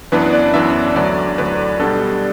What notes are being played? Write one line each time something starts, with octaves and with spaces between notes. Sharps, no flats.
F#2 E3 B3 D4 B4
D5
F#2 E3 B3 D4 E5
D2 D3 F#3 D5
D2 D3 F#3 B4
B2 G3 B3 D4 A4